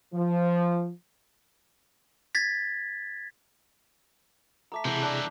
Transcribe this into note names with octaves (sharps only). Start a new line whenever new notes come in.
F3
G#6 A6 B6
A3 A#5 D6 E6 B6
C3 E3 G#3 B3 E4 G#4 G6
D4 A5 D6 F#6